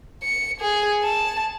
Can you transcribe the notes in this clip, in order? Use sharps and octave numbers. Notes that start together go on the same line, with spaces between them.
C#7
G#4
A5